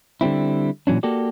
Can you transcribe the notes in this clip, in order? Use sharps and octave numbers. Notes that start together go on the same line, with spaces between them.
D3 G3 C4 E4
A#2 E3 F#3 C#4 D4
A#3 F#4 G4 A4 D5